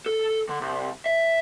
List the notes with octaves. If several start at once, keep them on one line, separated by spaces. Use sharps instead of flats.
A4
D3
C2
E5